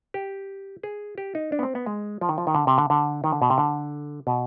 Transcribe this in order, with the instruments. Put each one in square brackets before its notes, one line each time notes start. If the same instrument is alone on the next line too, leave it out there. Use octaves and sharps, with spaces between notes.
[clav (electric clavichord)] G4
G#4
G4
D#4
D4
B3
C4
B3
G#3
F3
D#3
F3
D#3
D3
C3
D3
D3
D#3
D3
B2
C3
D3
B2